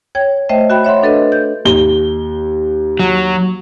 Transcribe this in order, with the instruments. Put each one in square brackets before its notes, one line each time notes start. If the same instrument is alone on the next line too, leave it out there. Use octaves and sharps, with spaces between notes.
[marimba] C#5 G5 G#6
A3 C5 D#5 E5 G5
F#4 E5 G5 B5
C#5 E5 F#5 C6
D4 A4 B4 D#5
G6
[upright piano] D#2 G7
[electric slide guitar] F#3